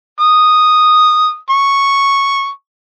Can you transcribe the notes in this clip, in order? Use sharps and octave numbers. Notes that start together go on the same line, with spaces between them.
D#6
C#6